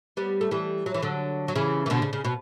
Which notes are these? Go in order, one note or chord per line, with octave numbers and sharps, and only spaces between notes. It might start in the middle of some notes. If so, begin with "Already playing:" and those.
G3 B3
A3
E3 G3
F#3
E3
D3 F#3
F#3
C#3 E3
E3
B2 D3
C#3
C#3
B2